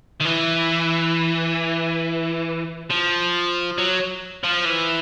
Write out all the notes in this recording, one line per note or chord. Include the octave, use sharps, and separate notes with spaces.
D#3
E3
F3
F#3
F3
E3